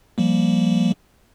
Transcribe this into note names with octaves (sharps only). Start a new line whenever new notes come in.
F3 G3 A#3